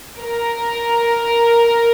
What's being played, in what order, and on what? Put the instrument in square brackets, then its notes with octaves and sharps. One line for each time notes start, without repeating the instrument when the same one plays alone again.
[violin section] A#4